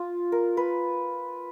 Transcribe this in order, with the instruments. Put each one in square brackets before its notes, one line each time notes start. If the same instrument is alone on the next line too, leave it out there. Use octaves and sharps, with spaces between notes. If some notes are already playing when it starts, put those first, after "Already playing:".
Already playing: [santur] F4
A#4
B4